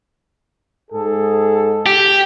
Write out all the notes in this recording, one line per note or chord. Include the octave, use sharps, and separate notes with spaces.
G#2 G#4 A4
G4